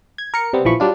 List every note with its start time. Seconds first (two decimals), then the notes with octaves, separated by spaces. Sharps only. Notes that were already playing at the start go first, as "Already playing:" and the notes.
0.18 G#6
0.34 A#4 C#7
0.53 C3 G3 B3 C4
0.65 A#1 E3 F3 B5 C#6
0.80 F#3 G3 D4 F4